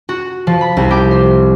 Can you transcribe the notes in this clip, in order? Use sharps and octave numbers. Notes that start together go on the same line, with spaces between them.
F#4
F3
B5
C2
G4
C5